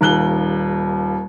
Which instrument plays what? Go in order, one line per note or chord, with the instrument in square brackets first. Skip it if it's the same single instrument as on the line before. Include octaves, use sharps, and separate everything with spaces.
[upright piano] D#1 D#2 F#6 G7